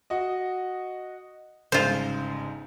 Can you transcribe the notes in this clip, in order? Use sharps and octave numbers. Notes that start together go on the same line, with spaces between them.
F#4 D#5
G1 G#2 C#3 F4 C5